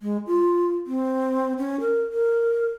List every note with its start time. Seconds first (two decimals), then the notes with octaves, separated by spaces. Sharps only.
0.01 G#3
0.27 F4
0.87 C4
1.58 C#4
1.80 A#4
2.13 A#4